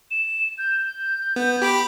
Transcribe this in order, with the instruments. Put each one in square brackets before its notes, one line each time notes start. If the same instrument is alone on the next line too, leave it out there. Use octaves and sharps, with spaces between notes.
[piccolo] E7
G6
[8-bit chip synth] B3
G4 B5 D6